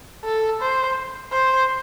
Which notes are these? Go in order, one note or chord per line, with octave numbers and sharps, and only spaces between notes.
A4
C5
C5